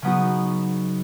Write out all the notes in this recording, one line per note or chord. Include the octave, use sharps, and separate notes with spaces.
C#3 F#3 B3 D#4 F#4